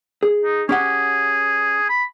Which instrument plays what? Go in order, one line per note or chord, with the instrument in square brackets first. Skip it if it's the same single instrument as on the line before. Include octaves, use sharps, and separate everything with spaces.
[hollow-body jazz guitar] G#4
[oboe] D#4
[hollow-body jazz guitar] C#4 G4 F#5 [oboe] G#4
[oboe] B5